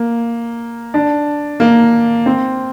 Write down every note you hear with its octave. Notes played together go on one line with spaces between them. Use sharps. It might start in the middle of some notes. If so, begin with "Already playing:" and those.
Already playing: A#3
D4
A#3
C4